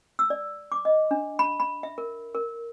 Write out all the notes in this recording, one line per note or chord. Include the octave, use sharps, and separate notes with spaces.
E6
D5
D6
D#5
D4
B5
B5
E5
A#4
A#4